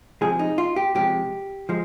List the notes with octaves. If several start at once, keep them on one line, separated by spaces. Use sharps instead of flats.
C3 F3 G#3 G#4
D#4
F4
G4
C3 F3 G#3 G4
F3 G#3